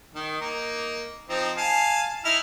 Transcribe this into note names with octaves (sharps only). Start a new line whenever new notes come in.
D#3
A#3 D#4
F3 C4 D#4
F5 G#5 A5
D#4 E4 F6